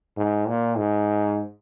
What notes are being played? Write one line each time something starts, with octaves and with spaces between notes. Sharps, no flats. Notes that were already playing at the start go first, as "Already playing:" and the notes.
G#2
A#2
G#2